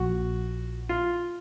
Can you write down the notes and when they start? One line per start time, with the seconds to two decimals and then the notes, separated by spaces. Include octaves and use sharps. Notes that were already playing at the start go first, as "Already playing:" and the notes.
Already playing: A#1 A#2 F3 F#4
0.89 F4